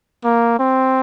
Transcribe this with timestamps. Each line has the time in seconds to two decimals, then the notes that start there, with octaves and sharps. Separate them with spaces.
0.24 A#3
0.59 C4